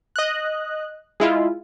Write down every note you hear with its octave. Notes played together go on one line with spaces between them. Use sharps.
D#5 F#6
G#3 E4 F4